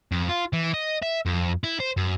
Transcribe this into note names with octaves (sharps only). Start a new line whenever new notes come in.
F2
F4
E3
D#5
E5
F2
E4
C5
F#2